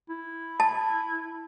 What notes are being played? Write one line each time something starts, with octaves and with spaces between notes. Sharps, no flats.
E4
A5